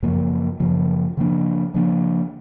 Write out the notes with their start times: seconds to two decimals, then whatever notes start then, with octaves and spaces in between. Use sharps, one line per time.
0.03 F#2 C#3 F3 A#3
0.60 F#2 C#3 F3 A#3
1.17 C#3 F3 A#3 D4
1.74 C#3 F3 A#3 D4